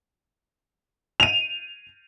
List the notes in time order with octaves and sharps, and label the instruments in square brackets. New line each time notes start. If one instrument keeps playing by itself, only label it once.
[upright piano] D#7 F7